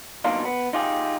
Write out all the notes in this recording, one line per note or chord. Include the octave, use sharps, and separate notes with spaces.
F#2 B2 A#3 D4 D#4 F4
B3
D#4 F4 G4 G#4